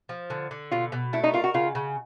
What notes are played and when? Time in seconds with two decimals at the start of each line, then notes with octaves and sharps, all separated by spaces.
0.09 F3
0.30 D3
0.51 D3
0.71 B2 F4
0.92 B2
1.13 A3 E4
1.24 D#4
1.34 F4 A#4
1.44 F#4
1.54 C#3 F4
1.75 C#3